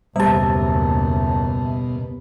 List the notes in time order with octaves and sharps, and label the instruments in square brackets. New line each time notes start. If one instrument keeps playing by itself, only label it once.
[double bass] F#1 D#2 [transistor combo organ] B2 [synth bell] G3 G4 [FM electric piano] E5 A5